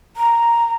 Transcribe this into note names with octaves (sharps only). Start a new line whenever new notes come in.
A#5